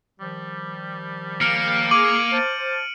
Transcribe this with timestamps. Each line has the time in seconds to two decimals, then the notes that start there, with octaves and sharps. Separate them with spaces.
0.19 D#3 F3 G3
1.41 A#3 F6 C#7 D7
1.91 G#4 D6 D7 D#7 F#7
2.32 C5 A5